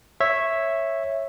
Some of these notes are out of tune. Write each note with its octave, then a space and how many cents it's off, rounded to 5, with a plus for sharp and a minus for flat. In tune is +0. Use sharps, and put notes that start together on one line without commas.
C#5 -10 E5 +0